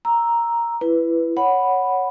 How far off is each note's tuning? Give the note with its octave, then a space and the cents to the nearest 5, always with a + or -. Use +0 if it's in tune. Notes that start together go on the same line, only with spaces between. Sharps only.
A#5 +0 E6 +0
E4 +20 B4 +0
C#5 +0 F#5 +0 B5 +0